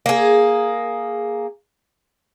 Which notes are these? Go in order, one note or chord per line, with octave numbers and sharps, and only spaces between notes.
A#3 G#4